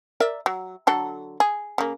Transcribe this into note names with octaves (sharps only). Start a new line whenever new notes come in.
A#4 D5 E5
F#3
D3 F#3 A4
G#4
C#3 A#3